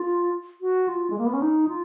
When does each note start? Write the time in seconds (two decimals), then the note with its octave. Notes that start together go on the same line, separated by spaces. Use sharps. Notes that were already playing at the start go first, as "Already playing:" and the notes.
Already playing: F4
0.61 F#4
0.88 F4
1.10 G#3
1.18 A#3
1.26 B3
1.33 C#4
1.42 D#4
1.68 F4